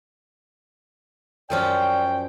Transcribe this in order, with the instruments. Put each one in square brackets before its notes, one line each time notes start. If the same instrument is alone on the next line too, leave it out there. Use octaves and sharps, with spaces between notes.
[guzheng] F#2 F3 C#4 [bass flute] D5 [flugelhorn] G5